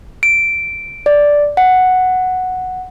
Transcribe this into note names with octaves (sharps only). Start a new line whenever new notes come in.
D7
D5
F#5